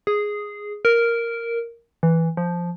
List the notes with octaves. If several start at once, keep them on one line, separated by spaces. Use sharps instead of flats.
G#4
A#4
E3
F3